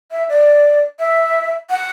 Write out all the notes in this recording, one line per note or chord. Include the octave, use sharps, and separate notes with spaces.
E5
D5
E5
F#5